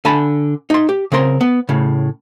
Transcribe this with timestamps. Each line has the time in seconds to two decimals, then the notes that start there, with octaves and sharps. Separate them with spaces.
0.05 D3 G#5 A5 B5
0.70 D#4 C6
0.89 G4
1.12 C#3 C4 A#4 C6
1.41 B3
1.69 A2 C#3